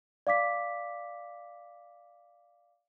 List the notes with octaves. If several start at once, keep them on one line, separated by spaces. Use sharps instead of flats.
D5 F5 D6 B6